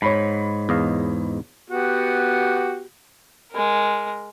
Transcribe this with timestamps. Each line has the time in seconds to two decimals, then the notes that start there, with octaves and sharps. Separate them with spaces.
0.02 G#2 C#5 B5
0.69 E2 D#5 F5
1.70 B3 F#4 G4
3.52 G#3 A#4